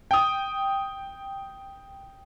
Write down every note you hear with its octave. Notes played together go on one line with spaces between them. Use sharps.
G5 D#6